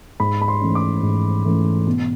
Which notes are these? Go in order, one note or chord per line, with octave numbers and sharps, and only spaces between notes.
G#2 B5
B5
C6
E3 A3 C#4
D6
G#2
E3 A3 C#4
B2